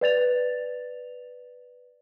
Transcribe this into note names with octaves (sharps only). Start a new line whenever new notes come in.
B4 D5 A6 F7